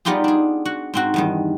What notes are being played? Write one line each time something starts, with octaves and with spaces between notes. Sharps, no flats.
G3 B3 D#4 F4 G4 G#4
D4 G#4
F#4 F#5
G#2 C4 F#4
E2 G2 D#3